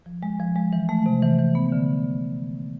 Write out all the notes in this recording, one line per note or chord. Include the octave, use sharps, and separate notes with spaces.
F3
G#3
F3
G#3
E3
A3
C3
E3
E3
B3
D3